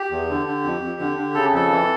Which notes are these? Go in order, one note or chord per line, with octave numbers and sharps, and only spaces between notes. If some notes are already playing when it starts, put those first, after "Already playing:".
Already playing: G4
E2
D3
D3
F2
F2
D3
D3
C#3 A4
F2 A4
E3